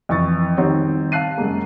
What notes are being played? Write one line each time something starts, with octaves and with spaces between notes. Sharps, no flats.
F2 E3 C#6 A6
D#3 G3 C4 D#4 F#4 C#5
F5 A5 F#6 C7 D#7
F#2 G#3 A#3